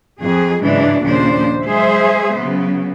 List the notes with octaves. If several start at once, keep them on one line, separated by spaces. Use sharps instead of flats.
F2 G#4
G#2 C#3 E3 F#3 D4
D#2 A#2 C#3 F3 D4 C5
F#3 G#3 G#4 C5 E5
C#3 F#3 B3